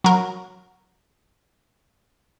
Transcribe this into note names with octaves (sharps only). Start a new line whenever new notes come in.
F#3 A#4